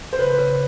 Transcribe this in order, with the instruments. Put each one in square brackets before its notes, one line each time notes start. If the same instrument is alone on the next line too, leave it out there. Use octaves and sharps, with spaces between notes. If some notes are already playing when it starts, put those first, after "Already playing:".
[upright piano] C5
[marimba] C#3 [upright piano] B4
[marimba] C#3